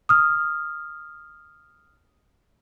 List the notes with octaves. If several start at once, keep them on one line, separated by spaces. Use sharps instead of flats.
D#6 F6